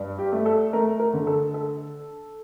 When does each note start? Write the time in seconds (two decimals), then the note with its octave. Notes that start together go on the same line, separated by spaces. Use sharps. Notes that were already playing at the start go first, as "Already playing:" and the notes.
Already playing: G2
0.18 G4
0.32 A3
0.46 A4
0.73 A3 A#4
0.99 A#4
1.13 D3
1.27 A4
1.54 A4